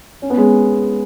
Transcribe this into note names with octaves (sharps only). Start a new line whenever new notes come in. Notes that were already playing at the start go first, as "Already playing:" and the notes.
C#4
B3
G#3 C#4